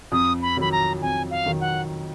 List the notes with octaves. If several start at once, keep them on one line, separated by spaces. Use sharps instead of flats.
F2 D#6
B5
D#3 F#3 B5
A#5
F2 G#5
F5
D#3 F#3
F#5